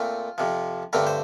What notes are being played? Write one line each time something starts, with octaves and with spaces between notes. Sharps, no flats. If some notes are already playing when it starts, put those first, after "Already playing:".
Already playing: A#2 A3 C4 F4
F2 C3 F3
G2 D3 A3 C4 A#4
C5